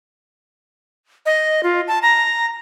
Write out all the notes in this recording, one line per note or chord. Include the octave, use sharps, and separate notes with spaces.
D#5
F4
A5
A#5